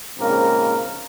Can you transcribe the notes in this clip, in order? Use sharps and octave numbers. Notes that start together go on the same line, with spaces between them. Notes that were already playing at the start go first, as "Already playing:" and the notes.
A#1 G#2 C#3 A#3 C4 A#4